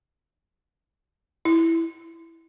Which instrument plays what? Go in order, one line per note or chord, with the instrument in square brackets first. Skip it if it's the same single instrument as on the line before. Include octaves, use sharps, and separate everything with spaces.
[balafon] E4